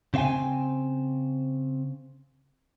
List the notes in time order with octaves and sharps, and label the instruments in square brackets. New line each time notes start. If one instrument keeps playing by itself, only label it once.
[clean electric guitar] C#3 C4 F5 G5 G#5